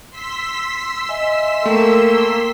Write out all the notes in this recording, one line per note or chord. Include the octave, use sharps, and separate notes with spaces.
C6 E6 B6
D#5 E5 G#5
A3 A#3 G5